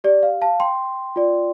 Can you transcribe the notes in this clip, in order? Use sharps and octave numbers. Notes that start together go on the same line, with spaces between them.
G4 D5
F5
F5 A5
G5 C6
F4 D5